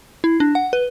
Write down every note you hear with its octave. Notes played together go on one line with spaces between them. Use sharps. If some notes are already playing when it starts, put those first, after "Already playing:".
E4
D4
F#5
B4